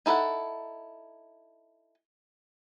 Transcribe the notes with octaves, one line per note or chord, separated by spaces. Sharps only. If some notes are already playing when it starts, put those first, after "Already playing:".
D#4 E4 A4 D5 F#5